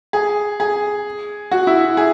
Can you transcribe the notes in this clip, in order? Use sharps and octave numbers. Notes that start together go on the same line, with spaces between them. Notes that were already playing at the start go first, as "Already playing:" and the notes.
G#4
G#4
F#4
E4
G#4